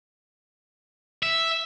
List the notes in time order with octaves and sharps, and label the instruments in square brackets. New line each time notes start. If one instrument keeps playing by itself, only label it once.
[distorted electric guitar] E5